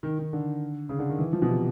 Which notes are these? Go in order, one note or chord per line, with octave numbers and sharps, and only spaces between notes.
D#3
D#3
D3
C#3
D3
D#3
E3
F3
B2
C3